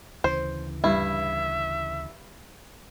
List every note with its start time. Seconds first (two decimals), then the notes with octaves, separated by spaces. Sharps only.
0.24 D2 C#3 E3 C5
0.84 G2 E4 E5